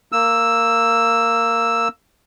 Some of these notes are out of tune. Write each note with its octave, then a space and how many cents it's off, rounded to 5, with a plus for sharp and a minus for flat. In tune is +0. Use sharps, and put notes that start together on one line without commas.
A#3 -15 E6 +0